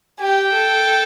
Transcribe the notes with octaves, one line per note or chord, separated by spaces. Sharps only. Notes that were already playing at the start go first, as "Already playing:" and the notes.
G4 G5
A4